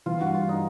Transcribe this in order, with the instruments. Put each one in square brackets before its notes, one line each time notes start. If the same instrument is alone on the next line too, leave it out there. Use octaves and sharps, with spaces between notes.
[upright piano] E3 [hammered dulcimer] F4
[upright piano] G2 [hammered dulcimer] F#4
[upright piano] G2 [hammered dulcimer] F4
[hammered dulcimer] D#4